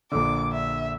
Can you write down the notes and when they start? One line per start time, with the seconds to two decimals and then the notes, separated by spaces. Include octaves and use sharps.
0.12 A#1 D3 D6
0.53 E5